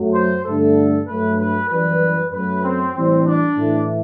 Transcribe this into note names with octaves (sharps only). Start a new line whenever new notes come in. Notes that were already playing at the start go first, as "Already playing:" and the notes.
Already playing: F#2 F#3 A3
C5
G2 D3 A3 A4
G2 F#3 A3 B4
B4
F#2 E3 G3 B4
F#2 F#3 A3 B4
C4
A2 E3 G3 C4
D4
A2 E3 A3